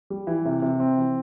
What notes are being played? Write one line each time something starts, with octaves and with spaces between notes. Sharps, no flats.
G3
E3
C3
C3
C4
E3